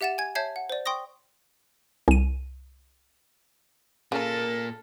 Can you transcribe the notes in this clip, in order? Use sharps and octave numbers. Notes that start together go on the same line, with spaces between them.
G4 E5 F#5 A6 E7
G#5 G#6
C#5 E5 A5 G6 G#6 C7
F#5
C5 D5
G5 C6 C#6 D#6 A#6
C2 D#7
A#2 C#3 A4 A#4 A#5